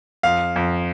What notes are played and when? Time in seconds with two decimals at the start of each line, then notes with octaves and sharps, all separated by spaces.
0.23 F2 F5
0.56 F2